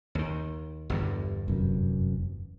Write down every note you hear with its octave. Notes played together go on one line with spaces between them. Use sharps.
D#2 D#3
G1 E2 G2
F1 F#2